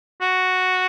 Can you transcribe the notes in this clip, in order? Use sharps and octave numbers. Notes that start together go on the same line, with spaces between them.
F#4